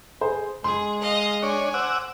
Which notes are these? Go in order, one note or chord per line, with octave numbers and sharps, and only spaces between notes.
G#4 C5
G#3 G#4 C6
D#5 F5
D4 C#5 G#5
C5 F#5 D6 E6